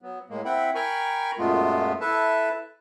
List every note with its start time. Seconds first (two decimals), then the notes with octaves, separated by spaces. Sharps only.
0.02 F#3 B3
0.30 A2 G#3 A#3
0.45 C4 E4 E5 F#5 G5 B5
0.75 A#4 G5 G#5 A#5 B5 C#6
1.39 F#2 A#2 G#3 A3 B3 F4
2.01 E4 A4 B4 E5 A5